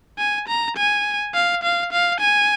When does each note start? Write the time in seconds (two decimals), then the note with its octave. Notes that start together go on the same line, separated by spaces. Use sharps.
0.18 G#5
0.48 A#5
0.77 G#5
1.35 F5
1.63 F5
1.93 F5
2.20 G#5